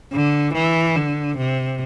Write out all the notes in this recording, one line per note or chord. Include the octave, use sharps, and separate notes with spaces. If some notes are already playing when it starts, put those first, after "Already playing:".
D3
E3
D3
C3